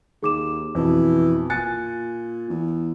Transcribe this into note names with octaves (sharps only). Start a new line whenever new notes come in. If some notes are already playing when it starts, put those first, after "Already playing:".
D#2 G#4 D6 E7
F2 B2 E3
A#2 G#5 F#6 A6 C#7
E2